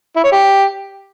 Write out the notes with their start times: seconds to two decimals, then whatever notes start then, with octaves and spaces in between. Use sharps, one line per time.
0.16 E4
0.24 C#5
0.32 G4